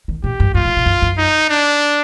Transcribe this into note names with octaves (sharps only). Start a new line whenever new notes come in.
D#3
A#2 G4
G2
G#2 F4
A2
A#2
F#2
F#2
D#4
D4